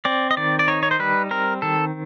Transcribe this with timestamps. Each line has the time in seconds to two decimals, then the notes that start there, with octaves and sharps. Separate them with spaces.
0.05 C4 D5
0.31 D#5
0.37 D#3 D5
0.59 D5
0.68 D#4 C#5
0.83 C#5
0.91 C5
0.99 G3 B4
1.31 C4 A#4
1.62 D#3 A4